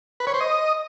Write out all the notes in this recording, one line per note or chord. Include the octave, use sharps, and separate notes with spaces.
B4
C#5
C5
D#5